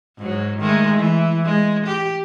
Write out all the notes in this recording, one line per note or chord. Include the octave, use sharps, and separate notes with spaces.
G#2 F#3
D#3 G#3 A3
E3
G#3
G4